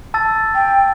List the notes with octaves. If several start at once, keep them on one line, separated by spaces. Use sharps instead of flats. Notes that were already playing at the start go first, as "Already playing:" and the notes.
A5 E6 A6
G5